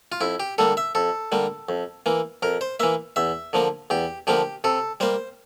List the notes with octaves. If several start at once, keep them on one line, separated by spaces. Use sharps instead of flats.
F4
F2 E4
G4
D3 G3 A#3 A4
E5
F2 A4
D3 G3 A#3
F2
E3 A#3
F2 A#4
C5
E3 A#3 E5
E2 E5
D3 F3 A#3
E2 G4
D3 F3 A#3 G4
C3 A4
G3 A#3 C5